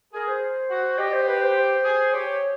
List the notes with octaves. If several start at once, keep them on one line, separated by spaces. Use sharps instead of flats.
G#4 A#4
C5
F#4
G4 D#5
C5
B4
C5
C5
G#4
G4 C#5